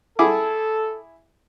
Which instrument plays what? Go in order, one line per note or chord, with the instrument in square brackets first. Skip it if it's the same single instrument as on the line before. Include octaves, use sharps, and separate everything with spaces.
[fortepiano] E4 G#4 D6 [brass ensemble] A4